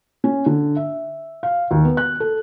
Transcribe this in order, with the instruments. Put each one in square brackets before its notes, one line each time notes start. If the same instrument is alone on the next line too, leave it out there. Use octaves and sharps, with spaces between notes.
[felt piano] C#4
D3
E5
F5
D#2
B3
F#6
A4